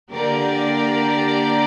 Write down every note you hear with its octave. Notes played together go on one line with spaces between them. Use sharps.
D3 A#3 G4 A#4 D5